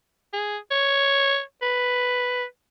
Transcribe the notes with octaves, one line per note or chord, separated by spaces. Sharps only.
G#4
C#5
B4